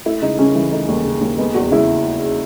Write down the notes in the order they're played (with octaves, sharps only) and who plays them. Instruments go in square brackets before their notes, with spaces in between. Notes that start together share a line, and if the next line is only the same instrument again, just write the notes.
[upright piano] A3 E4
C#3 D#4
C#3 C#4
E3
A3 D#4
D#2
C#3
D#2
G#3 B3
E2 F#4
C#3 E4